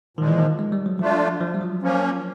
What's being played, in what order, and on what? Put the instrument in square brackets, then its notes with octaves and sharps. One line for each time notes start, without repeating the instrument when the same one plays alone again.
[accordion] A#2 F3 G#3 [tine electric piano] D#3
[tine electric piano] E3
D#3
G#3
G3
F#3
[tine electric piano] F3 [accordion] A3 D4 F4
[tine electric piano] F3
G3
F#3
[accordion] F3 A#3 C#4